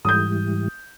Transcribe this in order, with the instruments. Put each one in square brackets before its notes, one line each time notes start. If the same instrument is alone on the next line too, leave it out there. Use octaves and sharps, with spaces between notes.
[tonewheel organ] G#2 E3 G3 [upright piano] D#6 G6